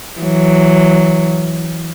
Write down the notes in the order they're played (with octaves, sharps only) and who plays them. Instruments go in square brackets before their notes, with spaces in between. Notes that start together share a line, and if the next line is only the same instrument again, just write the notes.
[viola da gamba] E3 F#3